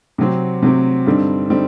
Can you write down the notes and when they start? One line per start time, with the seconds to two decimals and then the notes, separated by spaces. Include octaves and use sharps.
0.18 C3 F#3 C4
0.62 C3 F#3 C4
1.06 G2 D3 G3 C4 D#4
1.50 D3 G3 C4 D#4